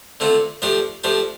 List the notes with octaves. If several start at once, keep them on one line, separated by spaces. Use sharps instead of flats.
D3 A3 C4 F4
F3 A3 D4 G4 C5
F3 A3 D4 G4 C5